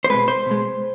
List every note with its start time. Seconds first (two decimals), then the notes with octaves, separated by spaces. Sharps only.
0.04 C5
0.10 B2 G#3 B4
0.28 C5
0.46 B2 G#3